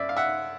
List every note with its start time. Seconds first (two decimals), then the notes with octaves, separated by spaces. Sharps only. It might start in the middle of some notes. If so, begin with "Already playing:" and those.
Already playing: F#2 D5 E5
0.09 F5
0.17 E5 F#5